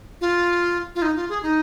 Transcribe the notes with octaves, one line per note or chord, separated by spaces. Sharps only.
F4
F4
D#4
F4
G#4
D#4